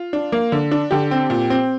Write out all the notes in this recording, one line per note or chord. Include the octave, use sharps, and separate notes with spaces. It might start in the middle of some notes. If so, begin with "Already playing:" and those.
Already playing: F4
D4
A#3
D3
D4
D3 G4
C4
A#2
C4